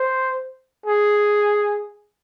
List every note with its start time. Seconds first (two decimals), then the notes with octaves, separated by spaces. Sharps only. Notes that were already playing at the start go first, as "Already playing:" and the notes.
Already playing: C5
0.86 G#4